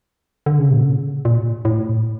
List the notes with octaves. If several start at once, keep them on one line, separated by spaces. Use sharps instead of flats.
D3
C#3
A#2
C#3
A#2
A2